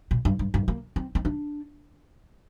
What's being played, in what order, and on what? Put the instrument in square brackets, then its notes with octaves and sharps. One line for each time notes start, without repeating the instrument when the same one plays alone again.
[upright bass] A#2
G2
G2
G2
A#3
C4
C4
D4